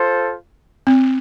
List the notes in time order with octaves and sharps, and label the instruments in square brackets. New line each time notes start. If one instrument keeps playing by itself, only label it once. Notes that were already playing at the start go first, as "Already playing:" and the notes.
Already playing: [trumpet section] F4 A4 C5
[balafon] C4